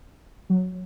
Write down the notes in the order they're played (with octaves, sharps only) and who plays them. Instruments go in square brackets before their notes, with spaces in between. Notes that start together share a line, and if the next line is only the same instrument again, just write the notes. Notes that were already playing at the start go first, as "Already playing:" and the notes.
[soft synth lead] F#3